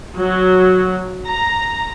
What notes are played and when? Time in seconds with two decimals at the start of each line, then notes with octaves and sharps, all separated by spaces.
0.19 F#3
1.28 A#5